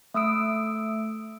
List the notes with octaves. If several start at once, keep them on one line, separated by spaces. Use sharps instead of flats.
A3 D#6 E6 D7